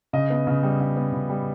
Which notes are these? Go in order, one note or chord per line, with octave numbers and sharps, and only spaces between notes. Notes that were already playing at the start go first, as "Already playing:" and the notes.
C#3 D#5
B3
C#3
G3
C#3
B3
C#3
G3